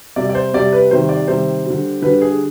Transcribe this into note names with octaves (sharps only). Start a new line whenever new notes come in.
C3 G3 D5
D5
C5
C3 G3 D5
B4
C3 D#3 G3 C5
D5
C3 D#3 G3 C5
D3 G3
D3 G3 B4
G#4